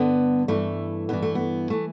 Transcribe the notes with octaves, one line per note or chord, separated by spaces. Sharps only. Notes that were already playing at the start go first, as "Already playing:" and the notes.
Already playing: G2 D3 B3
G2 E3 A3
G2 E3 B3
A3
B3
E3 A3